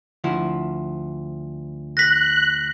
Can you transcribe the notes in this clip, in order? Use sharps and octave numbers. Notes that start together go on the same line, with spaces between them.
D2 F3 E4
F#6 A#6 B6